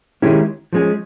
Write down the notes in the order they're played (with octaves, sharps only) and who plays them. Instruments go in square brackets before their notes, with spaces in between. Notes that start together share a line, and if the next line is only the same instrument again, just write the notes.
[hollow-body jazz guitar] D#3 G#3 C#4 E4 G4
F3 G#3 C#4